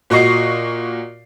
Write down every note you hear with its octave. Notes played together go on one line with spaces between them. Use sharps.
A#2 F#4 D#5 C#6 C7